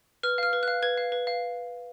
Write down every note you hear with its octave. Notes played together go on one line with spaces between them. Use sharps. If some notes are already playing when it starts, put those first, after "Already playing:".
B4 F6
F5 F6
B4
F#6
F5
B4 G#6
F5
B4
F5